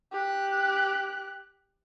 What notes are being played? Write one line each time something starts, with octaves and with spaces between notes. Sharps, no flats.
G4 F#6